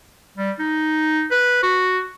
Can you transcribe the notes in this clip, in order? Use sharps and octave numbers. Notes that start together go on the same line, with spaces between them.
G3
D#4
B4
F#4